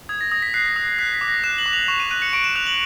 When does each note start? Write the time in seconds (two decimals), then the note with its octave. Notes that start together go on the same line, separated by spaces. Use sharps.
0.09 D#6 G#6
0.21 A#6
0.32 D#6 A#6
0.42 B6
0.54 F#6 C7
0.76 D#6
0.98 F#6 B6
1.14 B6
1.21 D6
1.28 A#6
1.44 F#6 E7
1.58 F#7
1.66 D6
1.73 F7
1.88 C#6 E7
2.00 D#7
2.11 F#6 D#7
2.22 C#7
2.33 C#6 D7
2.44 E7
2.56 F#6 F7
2.67 F#7